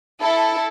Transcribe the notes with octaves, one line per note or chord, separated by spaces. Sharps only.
E4 A4